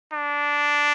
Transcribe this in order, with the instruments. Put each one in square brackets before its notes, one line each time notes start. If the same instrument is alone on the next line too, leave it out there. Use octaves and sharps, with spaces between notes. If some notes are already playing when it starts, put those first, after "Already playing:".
[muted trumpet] D4